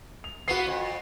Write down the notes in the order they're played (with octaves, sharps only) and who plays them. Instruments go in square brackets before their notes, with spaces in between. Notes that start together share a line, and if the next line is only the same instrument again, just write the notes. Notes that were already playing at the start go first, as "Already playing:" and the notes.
[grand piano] F7
[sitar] A#3 B3 [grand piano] F#4 C7
[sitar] F2